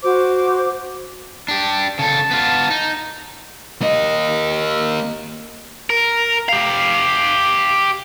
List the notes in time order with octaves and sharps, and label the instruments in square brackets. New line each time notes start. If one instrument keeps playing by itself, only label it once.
[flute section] F#4 C5 D6
[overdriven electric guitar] D4 G4
[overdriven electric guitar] C#3 A4 [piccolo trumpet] A5
[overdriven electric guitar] B3 F4
D#4
[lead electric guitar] A#3 D#5
[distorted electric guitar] A#4
G4 F5